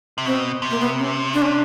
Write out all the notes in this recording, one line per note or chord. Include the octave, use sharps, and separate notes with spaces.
C3
B2 C4
C3
A#3
B3
C#4
D4
C#4
D4